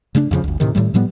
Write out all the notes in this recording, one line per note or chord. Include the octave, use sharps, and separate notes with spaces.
C#3 A3 C#4 D4
F2 C#3 F3
G1 D2
A2 C3 D#3
A2 D#3 G3 A3
A2 F3 G3 B3